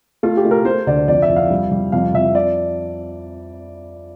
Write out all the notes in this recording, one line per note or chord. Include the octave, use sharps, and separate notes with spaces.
A3 F4
G4
A3
A#4
A3 C5
D2 D5
F2 D5
E5
F2
F5
G3
G3
F2 F5
F2 E5
D5